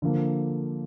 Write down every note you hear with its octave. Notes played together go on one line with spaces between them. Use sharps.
D3 F3 A#3